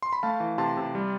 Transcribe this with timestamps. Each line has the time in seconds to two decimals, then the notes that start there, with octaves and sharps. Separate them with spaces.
0.02 C6
0.13 B5
0.23 A3 F5 A5
0.40 E3
0.58 C3 A5 C6
0.77 C3
0.95 G3